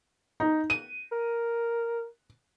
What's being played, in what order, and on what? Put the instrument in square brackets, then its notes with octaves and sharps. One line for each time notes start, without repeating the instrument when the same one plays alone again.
[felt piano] D#4
D#7
[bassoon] A#4